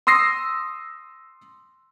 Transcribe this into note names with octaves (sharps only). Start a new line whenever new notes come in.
C6 D#6 E6 A#6 C7